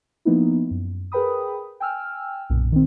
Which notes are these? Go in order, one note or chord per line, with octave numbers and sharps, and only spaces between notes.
F3 A#3 B3 D#4 E4
F#2
G#4 A#4 B4 G5 B5 D#6
G5 G#5 E6 F6
B1 F#2 A#2
D#3 C4